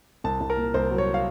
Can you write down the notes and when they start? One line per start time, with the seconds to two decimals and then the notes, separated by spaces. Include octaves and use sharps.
0.24 C2 A5
0.41 C2
0.50 A#4
0.57 A#2
0.74 C2 C5
0.91 F#3
0.98 C#5
1.14 F5